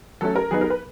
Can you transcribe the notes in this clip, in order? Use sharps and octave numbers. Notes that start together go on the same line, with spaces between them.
F#3 A3 C#4 A4
A#4
F#3 B3 D#4 G#4
A#4
B4